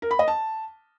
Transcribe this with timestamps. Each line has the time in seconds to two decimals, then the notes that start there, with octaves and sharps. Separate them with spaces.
0.02 A#4
0.11 B5
0.19 D#5
0.28 A5